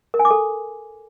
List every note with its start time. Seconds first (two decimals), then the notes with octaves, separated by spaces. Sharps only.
0.14 A#4
0.19 G#5
0.25 D6
0.31 A4